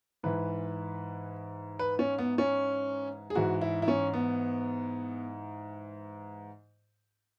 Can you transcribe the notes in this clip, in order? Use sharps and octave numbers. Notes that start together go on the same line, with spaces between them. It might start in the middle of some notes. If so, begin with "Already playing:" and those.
G#2 E3 B4
B4
C#4
B3
C#4
G#4
G#2 E3 F#4
E4
E4
C#4
B3